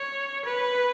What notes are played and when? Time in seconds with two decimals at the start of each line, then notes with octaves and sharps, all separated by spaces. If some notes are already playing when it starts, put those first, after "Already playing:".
Already playing: C#5
0.45 B4